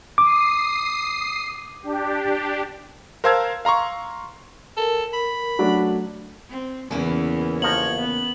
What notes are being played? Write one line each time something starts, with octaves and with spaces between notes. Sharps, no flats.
D6 D#6 C7
D4 G4
A#4 C5 F5 A5 E6 G#6
F5 A#5 C6 C#6
A4 A#4
B5
F#3 A3 D4
C4
E2 C#3 E3 A#3 C#4
G1 F3 C#5 A#5 F#7
B3